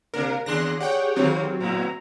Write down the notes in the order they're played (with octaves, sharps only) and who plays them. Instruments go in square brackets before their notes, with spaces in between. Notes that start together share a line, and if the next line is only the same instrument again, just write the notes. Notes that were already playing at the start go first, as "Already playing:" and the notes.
[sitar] C3 A#3 D4 [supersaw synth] A#4
[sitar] D#2 D4 [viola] G#4 [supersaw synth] C6 F#6 A#6
[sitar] G4 [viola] G#4 C#5 [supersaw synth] F#5 G5
[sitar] D#3 F4 G4 [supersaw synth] F#3 C4
[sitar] A2 B3 E4 [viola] A#5